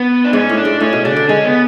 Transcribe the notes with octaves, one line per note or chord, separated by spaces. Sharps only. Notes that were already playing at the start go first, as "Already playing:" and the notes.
Already playing: B3
D4
G#2 C#4
A2
D4
G#2
A2 C#4
B2
C#3 D4
D3
G#3 C#4
B3